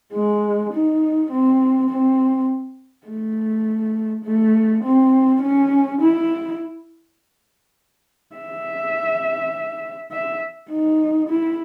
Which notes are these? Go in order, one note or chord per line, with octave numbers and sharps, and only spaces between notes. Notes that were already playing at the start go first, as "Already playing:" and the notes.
G#3
D#4
C4
C4
A3
A3
C4
C#4
E4
E5
E5
D#4
E4